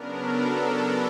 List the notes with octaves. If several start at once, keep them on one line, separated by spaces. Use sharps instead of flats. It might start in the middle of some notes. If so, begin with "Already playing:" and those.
Already playing: C#3 F#3 B3 D4 A#4
A4